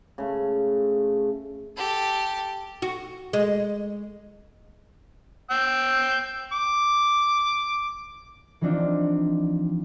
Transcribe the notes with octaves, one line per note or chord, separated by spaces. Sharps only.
C#3 A3
G4 A4
F#4
G#3
G5 E6
D6
E3 F3 C4 D4 D#4 F4